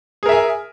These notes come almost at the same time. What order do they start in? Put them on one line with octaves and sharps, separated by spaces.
G#4 A#4 E5 G#5